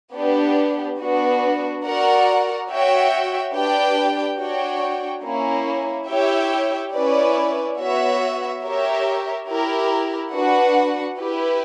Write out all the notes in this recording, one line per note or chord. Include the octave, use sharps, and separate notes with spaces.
B3 D4 G4
B3 D4 F#4
F#4 A#4 D5 F#5
F#4 C#5 E5 G5
D4 G4 B4 D5 G5
D4 F#4 C#5 G5
A#3 C#4 E4
E4 G4 C#5 E5 G5
C#4 E4 B4 D5
B3 F#4 C#5 E5
G4 A#4 C#5 E5
E4 G4 A#4
D4 F#4 B4 F#5
E4 G4 B4